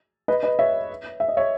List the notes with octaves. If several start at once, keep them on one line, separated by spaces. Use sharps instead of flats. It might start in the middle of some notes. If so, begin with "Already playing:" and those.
B4 D#5
B4 D#5
C#5 E5
E5
D#5
C#5 E5